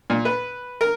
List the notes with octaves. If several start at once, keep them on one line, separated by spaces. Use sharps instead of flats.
A#2
B4
A#4